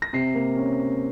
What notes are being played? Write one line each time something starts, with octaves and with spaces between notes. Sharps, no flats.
A#6
C3 C7
A#3
C#4